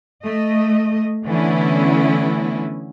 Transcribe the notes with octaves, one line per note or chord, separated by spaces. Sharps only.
A3 D#5
D3 E3 A3 B3 C#4 E4